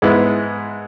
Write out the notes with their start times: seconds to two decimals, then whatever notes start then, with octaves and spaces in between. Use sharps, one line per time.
0.02 G#2 G#3 B3 E4